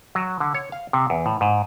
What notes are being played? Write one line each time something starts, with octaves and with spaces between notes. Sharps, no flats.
F#3
D3
C#5
F5
C3
E2
A2
G#2